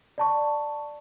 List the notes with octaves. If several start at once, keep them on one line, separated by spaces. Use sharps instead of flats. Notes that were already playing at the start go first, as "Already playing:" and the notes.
D5 A5 C#6